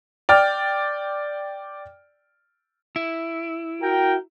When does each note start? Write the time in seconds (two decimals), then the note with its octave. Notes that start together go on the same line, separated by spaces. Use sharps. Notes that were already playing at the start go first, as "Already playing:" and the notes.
0.29 D5 G5 F6
2.96 E4
3.81 F#4 A#4 G5